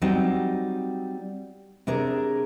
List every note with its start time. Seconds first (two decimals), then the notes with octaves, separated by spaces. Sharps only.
0.02 F#3 G3 C4 D#4
1.87 C3 D4 G#4 A#4